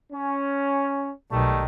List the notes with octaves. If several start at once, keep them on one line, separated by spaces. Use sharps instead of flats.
C#4
B1 B2 D#3 G3 A3